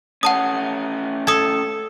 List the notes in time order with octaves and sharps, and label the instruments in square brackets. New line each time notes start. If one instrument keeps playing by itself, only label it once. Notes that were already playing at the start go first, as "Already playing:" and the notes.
[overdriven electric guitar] A3 C#4 [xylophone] F#5 A5 D#6
[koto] A4 [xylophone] D#6 G#6